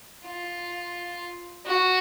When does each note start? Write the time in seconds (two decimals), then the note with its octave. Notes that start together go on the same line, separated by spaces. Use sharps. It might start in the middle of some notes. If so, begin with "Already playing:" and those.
0.25 F4
1.66 F#4